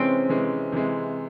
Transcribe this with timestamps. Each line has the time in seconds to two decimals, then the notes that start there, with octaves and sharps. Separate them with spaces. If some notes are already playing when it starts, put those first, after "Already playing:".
Already playing: C3 E3 G#3 C4 C#4
0.29 C3 E3 G#3 C#4
0.72 C3 E3 G#3